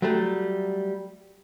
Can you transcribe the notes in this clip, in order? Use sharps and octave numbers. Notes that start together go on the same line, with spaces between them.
F#3 G3 A3